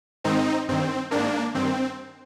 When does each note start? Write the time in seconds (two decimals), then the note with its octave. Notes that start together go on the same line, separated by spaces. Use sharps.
0.24 G#2 D#3 C4 D#4
0.68 G2 D#3 C4
1.11 G#2 D#3 A#3 D4
1.54 G2 D#3 C4